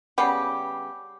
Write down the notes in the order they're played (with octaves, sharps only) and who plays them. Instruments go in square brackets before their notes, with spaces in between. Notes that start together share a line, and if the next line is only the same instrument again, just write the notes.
[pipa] C#3 G3 B3 G4